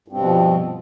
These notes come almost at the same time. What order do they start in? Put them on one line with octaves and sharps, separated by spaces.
G2 C4 B2 F3